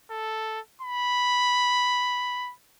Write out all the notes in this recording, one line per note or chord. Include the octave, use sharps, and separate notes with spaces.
A4
B5